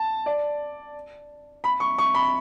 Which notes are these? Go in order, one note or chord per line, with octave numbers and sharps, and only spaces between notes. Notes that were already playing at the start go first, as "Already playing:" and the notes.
Already playing: A5
D5
B5
C#6
C#6
B5